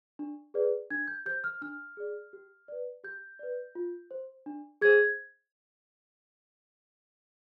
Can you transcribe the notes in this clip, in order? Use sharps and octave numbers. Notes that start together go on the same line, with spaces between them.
D4
G#4 B4 D5
D4 G#6
G6
G4 C5 G6
F6
D4 F6
G#4 D5
G4
B4 D5
G4 G6
B4 D5
F4
C5
D4
G#4 C5 G#6